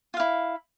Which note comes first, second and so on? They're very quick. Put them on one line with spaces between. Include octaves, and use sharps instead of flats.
F4 F5 E4